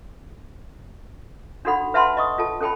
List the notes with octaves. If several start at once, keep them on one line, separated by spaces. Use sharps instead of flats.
D4 D#4 F#4 A4 F#5 B5
B4 E5 F#5 A5 B5 C6
D#5 C#6 D#6
F4 A4 A5
C#4 A4 G5 A5 B5